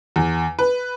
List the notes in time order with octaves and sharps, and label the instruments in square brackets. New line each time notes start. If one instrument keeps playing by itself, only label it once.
[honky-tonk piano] E2
B4